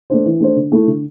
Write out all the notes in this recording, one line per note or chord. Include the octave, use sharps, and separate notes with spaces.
A3 D4 C5
E3
A3 D4 C5
D3
A3 E4
D3